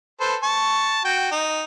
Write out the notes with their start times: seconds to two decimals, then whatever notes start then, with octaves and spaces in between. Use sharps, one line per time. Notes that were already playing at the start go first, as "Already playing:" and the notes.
0.21 A4 B4 C5
0.43 A5 C#6
1.05 F#4 G5
1.31 D#4